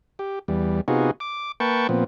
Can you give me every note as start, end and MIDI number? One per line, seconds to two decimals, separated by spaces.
0.19 0.39 67
0.48 0.81 40
0.48 0.81 55
0.88 1.11 48
0.88 1.11 59
0.88 1.11 63
0.88 1.11 65
0.88 1.11 66
0.88 1.11 68
1.20 1.52 86
1.60 1.87 58
1.60 1.87 71
1.60 1.87 79
1.60 1.87 81
1.60 1.87 85
1.89 2.04 46
1.89 2.04 53
1.89 2.04 59
1.89 2.04 60